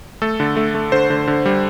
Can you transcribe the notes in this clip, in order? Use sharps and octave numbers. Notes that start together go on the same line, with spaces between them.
A3 A4
D3
A3
A3
D3 C5
D3
D3
G3